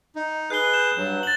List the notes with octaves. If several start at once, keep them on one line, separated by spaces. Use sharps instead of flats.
D#4
G#4 B4 F#6 G7
G6 E7
G2 F#3
A6 F#7